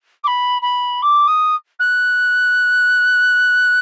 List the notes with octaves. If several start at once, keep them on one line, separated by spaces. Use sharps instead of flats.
D6
B5
B5
D6
D#6
F#6